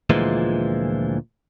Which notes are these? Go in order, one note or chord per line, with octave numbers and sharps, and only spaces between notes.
D2 A#2 E3 F3 G#3